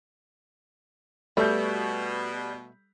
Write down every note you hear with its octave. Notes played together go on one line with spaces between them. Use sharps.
B2 G3 A3 G6